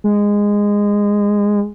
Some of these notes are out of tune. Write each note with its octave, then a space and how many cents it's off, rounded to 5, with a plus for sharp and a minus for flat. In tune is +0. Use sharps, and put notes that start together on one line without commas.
G#3 -15